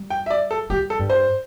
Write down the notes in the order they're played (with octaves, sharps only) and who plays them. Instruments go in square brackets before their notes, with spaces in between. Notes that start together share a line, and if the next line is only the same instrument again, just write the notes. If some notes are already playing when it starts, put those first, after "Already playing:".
Already playing: [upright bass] G3
[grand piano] G5
E5
D5
A4
[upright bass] G3 [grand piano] G4
[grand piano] A4
[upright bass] G2
[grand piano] C5